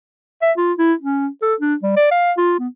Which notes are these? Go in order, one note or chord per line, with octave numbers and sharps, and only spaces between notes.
E5
F4
E4
C#4
A4
D4
G3
D5
F5
F4
B3